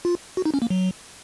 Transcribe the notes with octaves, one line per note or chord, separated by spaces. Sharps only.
F4
F#4
D#4
C#4
A#3
F#3